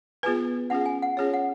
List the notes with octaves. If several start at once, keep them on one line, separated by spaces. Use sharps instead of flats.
B3 F4 G#4 B4 G#5
C#4 F4 G#4 F#5
G#5
F#5
C#4 F4 G#4 C#5
F#5